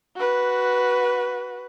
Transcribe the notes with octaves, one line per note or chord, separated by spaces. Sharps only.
F#4 B4